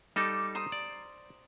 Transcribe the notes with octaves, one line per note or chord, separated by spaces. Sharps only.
G3 D#4 A4 D6
C5 A#5 D#6
D5